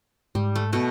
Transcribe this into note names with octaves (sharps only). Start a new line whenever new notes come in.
G#2 G3
A3
B2 A3